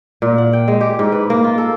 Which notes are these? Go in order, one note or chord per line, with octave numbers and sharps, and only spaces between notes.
A#2
F#5
G5
G#3
G4
G#2
B4
A#3
F4
A4